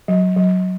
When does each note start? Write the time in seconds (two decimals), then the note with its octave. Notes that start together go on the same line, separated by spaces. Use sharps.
0.08 F#3
0.37 F#3